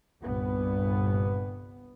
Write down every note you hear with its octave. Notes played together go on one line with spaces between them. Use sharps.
G1 C2 G2 A#2 B3